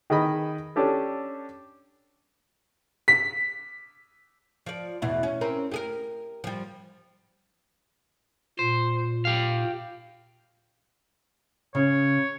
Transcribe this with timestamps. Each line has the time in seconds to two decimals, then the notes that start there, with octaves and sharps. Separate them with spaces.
0.10 D#3 G#4 D#5 B5
0.76 C#4 D4 G4 A4
3.08 B6
4.66 F3 D5
5.02 E2 B2 E4
5.23 C#4
5.41 C4 C#4 A#4
5.71 G4 G#4 A#4
6.44 F3 G3
8.59 A#2 C5
9.25 G4 F5
11.75 C#3 C#5